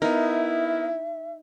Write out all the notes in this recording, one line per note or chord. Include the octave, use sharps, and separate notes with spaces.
B3 D#4 E4 A#4 E5